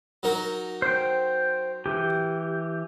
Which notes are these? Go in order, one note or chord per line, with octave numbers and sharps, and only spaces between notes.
F#3 D#4 A#4
C5 G5
E3 G4